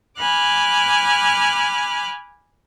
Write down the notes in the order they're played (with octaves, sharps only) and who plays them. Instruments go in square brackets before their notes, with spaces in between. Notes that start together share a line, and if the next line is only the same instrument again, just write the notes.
[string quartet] G#5 B5 D6 F6 F#6